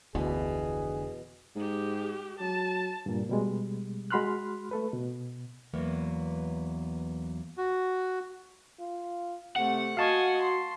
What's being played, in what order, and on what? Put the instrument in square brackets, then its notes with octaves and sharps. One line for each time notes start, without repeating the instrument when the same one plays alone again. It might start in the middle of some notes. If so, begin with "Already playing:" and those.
[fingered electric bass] F1 D3 [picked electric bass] D2 [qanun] B2 E3 [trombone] G#4
[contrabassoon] G#2 [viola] G#3 G4
[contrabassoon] F#3 [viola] A5
[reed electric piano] G2 A#2
B2 G3 G#3
G#3 F#4 B5 C6 F6 F#6
A3 A4 B4
B2
[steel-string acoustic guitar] E2 F#3 A#3 B3
[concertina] F#4
[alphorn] F4
[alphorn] C3 [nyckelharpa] A3 [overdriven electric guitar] F#5
[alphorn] F#4 [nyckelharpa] D#5 G#5 [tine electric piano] F5 A5 C#6
[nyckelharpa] C6